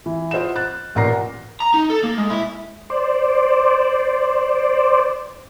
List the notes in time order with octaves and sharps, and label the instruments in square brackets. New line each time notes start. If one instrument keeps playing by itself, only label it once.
[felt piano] E3
F4 C5 D#5 F#5 E7
F#6 A6
A1 A#2 F#5 A#5 A#6 C7
[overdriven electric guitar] A#5
D#4
A4
A#3
G#3
E4
[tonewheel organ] C5 D5